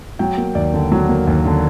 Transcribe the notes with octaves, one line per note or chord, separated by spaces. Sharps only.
F#3 G5
A#3
D#2 D5
D3
F#3
A#3
D#2
D3